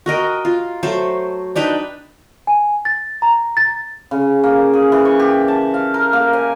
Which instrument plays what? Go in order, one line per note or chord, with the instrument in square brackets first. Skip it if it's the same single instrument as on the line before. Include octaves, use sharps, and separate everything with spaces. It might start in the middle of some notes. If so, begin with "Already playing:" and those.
[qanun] F#4 A#4 D#5 G5
F4
F#3 A3 C5
D4 D#4 B4 G5
[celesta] G#5
A6
A#5
A6
[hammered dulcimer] C#3
A#3
G#4
E3
C#6
G4
A5
F5
A#4
A#3
G#5